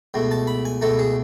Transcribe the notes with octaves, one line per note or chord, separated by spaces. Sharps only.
C#2 B2 A3
A5
B5
G#5
C#2 B2 A3 A4
G#4